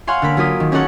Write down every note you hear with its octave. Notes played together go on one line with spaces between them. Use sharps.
C#5 F5 F#5 G#5 C6 C#6
D3 A#3 B5
F#3 A#3 F4 D#6 B6
D#3
C#4 D#4 G#4 A4 F#5 C#6